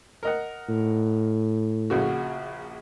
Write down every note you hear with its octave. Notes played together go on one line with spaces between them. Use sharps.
A#4 D#5 F#5
A2
A#1 C#3 F#4